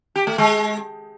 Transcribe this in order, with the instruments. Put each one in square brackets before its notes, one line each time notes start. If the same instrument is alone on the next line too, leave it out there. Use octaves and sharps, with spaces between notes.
[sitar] G4
A3
G#3